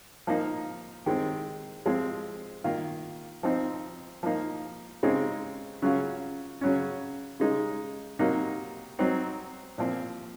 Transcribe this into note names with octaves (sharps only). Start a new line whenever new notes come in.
F3 A#3 D#4
D#3 G#3 C4
F3 G#3 C4
D#3 A#3 F4
F3 C4 D#4
F3 A#3 D#4
C#3 G#3 C4 D#4
C#3 F#3 C#4 F4
C#3 F#3 C#4
C#3 G#3 D#4
C3 F#3 A#3 D#4
F#3 C4 D#4
A#2 F3 C4